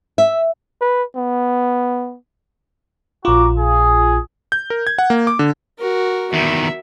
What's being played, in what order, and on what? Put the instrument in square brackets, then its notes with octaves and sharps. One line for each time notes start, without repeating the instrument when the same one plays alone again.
[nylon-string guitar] E5
[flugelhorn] B4
B3
[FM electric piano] A#1 F4 [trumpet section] F#4 A#5 D6
[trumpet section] G#4
[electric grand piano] G6
A#4
G#6
F#5
A#3
D6
D3
[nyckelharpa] F#4 A#4
[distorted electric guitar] E2 D#3 [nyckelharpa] E5